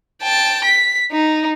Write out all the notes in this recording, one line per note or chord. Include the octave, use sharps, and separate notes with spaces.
G5 A5
B6
D#4